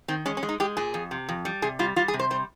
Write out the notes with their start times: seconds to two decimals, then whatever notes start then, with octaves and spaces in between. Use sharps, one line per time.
0.08 D#3 C4
0.26 G#3 C#4
0.37 C#4
0.43 G#3
0.49 D#4
0.60 G#3 G4
0.77 A#2 G#4
0.94 F2
1.11 C3
1.29 F2
1.45 G3
1.62 C3 G#4
1.79 G3 F4
1.96 G3 F4
2.08 G#4
2.14 C3
2.19 C5
2.30 G3 C5